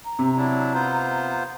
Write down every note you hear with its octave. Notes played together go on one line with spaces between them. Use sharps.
A#5
C3
F#3 D4 E4
B3 F4 C5